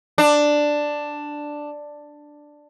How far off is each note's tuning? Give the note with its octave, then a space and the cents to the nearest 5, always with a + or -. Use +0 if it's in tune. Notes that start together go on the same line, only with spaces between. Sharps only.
D4 +5